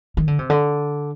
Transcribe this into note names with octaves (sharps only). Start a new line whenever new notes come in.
D#3
D3
C3
D3